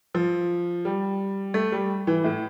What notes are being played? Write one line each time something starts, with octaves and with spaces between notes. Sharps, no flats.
F3
G3
A3
G3
E3
A2